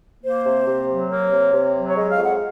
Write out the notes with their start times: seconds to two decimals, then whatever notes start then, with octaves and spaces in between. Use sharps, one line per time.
0.24 A#3 C5
0.45 C3
0.67 C3
0.89 F#3
1.10 A#3 C#5
1.32 C3
1.52 C3
1.74 F#3
1.89 C#5
1.96 G#3 D#5
2.10 F5
2.18 F2
2.25 F#5